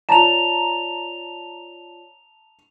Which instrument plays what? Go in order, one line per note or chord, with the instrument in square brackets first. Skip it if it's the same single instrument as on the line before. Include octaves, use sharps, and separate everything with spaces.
[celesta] F4 C#5 D5 [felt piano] A5 A#5 [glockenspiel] E7 F7